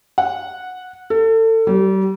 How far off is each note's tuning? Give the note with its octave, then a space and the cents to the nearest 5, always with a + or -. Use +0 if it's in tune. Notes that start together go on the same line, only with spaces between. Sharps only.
F#5 -10
A4 +30
G3 -35